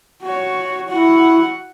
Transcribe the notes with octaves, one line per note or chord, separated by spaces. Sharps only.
F#4 C#5
E4 F#4 F#5